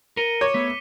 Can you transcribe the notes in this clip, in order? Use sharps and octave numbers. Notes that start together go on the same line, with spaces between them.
A#4 C#7 D#7 G7
C#5 D6
A3 B3 B6